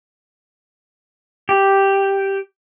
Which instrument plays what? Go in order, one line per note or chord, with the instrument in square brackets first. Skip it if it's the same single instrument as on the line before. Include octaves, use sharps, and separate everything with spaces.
[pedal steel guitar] G4